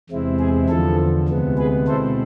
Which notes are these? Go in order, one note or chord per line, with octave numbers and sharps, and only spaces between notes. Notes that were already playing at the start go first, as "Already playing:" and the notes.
E2 C3 G#3 C4 E4
G#4
E2 D3 F3 A4
D2 C3 G#3 B3
G#4 B4
B2 G#3 C4 E4 A4 C5